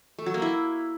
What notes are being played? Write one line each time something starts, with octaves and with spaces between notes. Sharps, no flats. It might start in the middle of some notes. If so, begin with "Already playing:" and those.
A3
F#3
A#3
E4